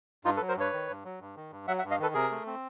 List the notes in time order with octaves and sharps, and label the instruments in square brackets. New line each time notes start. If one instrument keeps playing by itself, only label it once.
[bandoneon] G2 D#4 F4
A4 B4
F#3
A#4 C5
G2 B4 C#5
D#3
G2
F#3
G2
D#3
G2
F#3 E5 F#5
E5 F#5
G2
D#5 F5
D#3 A4 B4
C3 G#4 A#4
A3
C4